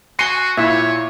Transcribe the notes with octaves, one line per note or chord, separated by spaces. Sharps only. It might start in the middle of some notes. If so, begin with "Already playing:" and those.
F#4 G#5 C6 C7 C#7 D#7
A#2 E4 C#5 E5